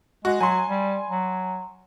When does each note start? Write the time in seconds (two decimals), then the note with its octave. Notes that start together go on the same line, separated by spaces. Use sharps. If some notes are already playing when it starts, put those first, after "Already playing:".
0.25 G#3 F#4
0.41 F#3 G#5 C6
0.70 G3
1.11 F#3